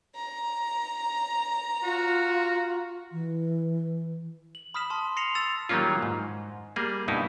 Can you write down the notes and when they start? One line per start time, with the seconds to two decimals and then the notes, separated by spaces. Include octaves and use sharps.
0.16 A#5
1.84 F4 F#4
3.12 E3
4.55 F#7
4.74 B5 D#6 F6 B6 E7
4.90 A5 C6 E7
5.16 C6 A#6 C7 C#7 E7 F7
5.35 E6 A6 E7 F7
5.69 D#3 F#3 G3 A#3 C#4 F4
6.02 G#2
6.76 G3 A#3 G#4
7.08 G2 B2 D#4 E4